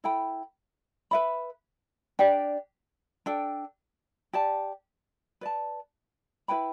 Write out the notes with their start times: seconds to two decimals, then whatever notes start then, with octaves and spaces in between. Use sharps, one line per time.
0.04 E4 A4 G5 B5
1.11 B4 E5 B5
2.19 D4 G4 D5 G5
3.26 D4 A4 G5
4.33 G4 D5 A5
5.41 B4 D5 A5
6.48 E4 B4 G5 B5